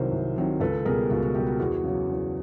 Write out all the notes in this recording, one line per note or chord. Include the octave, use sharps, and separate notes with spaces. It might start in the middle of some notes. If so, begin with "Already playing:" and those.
Already playing: C2 C3 D#3 F#3 A#4 C5
C2
C3 D#3 F#3
C#2 A4 B4
B2 G3 G#4 A#4
C#2 F#4
F#4
B2 G3 G4
F#4
E2 F#4 G#4
C#3 F#3
E2